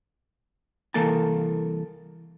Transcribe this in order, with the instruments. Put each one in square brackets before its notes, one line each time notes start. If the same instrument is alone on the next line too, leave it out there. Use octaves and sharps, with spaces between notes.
[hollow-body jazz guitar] C2 E3 A#3 A4 A#4 A5